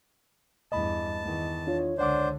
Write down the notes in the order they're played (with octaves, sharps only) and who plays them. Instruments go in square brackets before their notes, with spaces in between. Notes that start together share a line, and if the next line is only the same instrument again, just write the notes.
[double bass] E2 G2 [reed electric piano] D#5 B5 [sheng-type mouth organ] A5
[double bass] E2 D#3
[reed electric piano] D4 F4 [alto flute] C#5
[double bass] C#2 D3 [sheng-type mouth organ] D4 C5 [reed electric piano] D5 F#5 D6